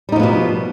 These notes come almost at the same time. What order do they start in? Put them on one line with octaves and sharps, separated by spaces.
G3 D#4 F3 B3 B2